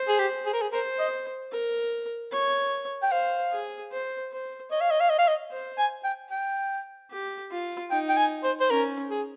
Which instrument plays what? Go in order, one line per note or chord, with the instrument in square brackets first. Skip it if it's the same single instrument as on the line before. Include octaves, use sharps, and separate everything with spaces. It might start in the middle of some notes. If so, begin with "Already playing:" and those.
Already playing: [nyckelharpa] C5
[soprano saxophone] G#4
G4
G#4
A#4
G#4
[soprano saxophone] A#4 [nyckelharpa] C5
[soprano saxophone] D#5
[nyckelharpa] A#4
C#5
[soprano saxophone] G5
[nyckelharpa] C5 [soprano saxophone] F5
[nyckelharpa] G#4
C5
C5
[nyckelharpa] C#5 [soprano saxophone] D#5
[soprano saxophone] F5
D#5
F5
D#5
F5
D#5
[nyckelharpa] C5
[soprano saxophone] G#5
G5
G5
[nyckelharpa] G4
F4
[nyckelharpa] D#4 [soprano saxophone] G5
[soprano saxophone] G5
G#5
C5
C5
[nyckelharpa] C#4 [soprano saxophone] A#4
[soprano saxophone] G#4